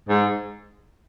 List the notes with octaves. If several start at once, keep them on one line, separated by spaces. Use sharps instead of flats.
G#2